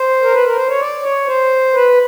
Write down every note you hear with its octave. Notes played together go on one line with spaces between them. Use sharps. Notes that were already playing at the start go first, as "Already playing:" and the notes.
Already playing: C5
A#4
B4
A#4
C5
C#5
D5
C#5
C5
B4